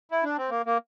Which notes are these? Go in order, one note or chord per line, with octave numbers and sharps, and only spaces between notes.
E4
D4
C4
A#3
A#3